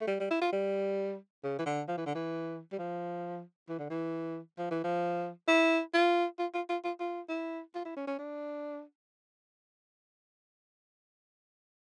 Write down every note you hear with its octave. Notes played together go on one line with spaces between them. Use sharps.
A3
G3
G3
E4
F4
G3
C#3
E3
D3
F3
E3
D3
E3
G3
F3
E3
D3
E3
F3
E3
F3
E4
F4
F4
F4
F4
F4
F4
E4
F4
E4
C#4
C#4
D4